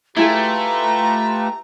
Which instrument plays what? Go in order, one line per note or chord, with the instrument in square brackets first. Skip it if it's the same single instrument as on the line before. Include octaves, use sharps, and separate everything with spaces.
[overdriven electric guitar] A3 [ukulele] E4 G#4 [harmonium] F4 G4 B4 [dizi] A#5